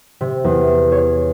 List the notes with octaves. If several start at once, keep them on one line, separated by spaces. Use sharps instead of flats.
C3
E2
C#5